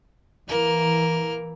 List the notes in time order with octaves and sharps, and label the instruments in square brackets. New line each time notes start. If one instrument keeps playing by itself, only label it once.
[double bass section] E3 [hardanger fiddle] A#3 A#4